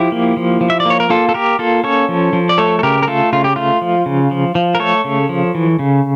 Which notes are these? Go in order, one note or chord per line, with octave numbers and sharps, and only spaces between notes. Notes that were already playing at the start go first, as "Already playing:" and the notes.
Already playing: F3 E4 G4
A#3
F3
F3
E5
D5
A#3 C#5
A#4
A#3 F4 A4
A4
A#3 G4 A#4
A#3 F4 A4
C#4 A4 C#5
F3
F3
D5
A3 A4 C#5
A4
C#3 G4 A#4
A#4
A3 F4 A4
C#3 F4
G4
A3 F4
F3
C#3
F3
F3
A#4
A3 A4 C#5
C#3
F3
E3
C#3